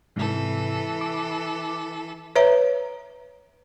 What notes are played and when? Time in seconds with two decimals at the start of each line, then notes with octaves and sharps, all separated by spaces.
0.16 G#2 C3 E3 A4
1.01 D6
2.36 B4 C#5 E5 A#5